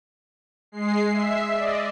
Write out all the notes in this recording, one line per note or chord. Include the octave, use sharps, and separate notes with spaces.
G#3 C7
E5
D5 D#5